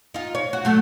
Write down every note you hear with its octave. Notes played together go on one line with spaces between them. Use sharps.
D#4 F4
C#5
F#4
F#3 A3 A4